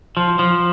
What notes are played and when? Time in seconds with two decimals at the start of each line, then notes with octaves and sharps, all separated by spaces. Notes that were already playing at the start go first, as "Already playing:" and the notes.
0.17 F3
0.39 F3